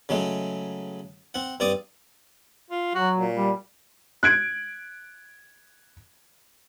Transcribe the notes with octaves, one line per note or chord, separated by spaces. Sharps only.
C#3 F#3 G#3 A3
C4 F#5
G2 C4 D5 D6 D#6
F4
F#3 F#4
A#2
G3
F#6 G#6 D7